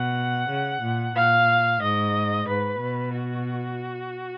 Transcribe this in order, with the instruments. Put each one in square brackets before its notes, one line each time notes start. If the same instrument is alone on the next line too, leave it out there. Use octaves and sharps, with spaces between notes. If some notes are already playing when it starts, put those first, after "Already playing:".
Already playing: [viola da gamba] B2 [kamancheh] F#5
[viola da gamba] C#3
A#2
[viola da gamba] A#2 [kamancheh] F5
[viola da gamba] G#2 [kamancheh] D#5
[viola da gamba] G#2 [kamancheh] B4
[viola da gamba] B2
[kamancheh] F#4